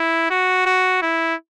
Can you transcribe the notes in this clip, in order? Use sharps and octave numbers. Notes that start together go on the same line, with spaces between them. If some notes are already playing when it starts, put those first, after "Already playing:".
Already playing: E4
F#4
F#4
E4